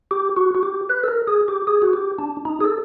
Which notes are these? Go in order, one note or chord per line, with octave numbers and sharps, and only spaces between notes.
G4
F#4
F#4
G4
B4
A4
A#4
G#4
G4
G#4
F#4
G4
D4
D#4
G#4
A4